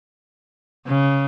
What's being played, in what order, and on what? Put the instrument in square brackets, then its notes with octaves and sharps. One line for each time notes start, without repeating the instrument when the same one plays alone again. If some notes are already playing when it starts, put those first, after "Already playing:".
[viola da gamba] C#3